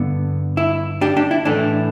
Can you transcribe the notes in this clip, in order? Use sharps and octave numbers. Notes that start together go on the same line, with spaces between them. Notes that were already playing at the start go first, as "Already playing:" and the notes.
Already playing: G2 D3 B3
E4
D4 G4
D4 G4
E4
A2 E3 A3 D4